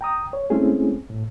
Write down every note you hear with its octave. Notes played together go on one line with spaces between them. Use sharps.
G5 A#5 D#6
C#5
G#3 A3 C4 C#4 E4 G#4
A2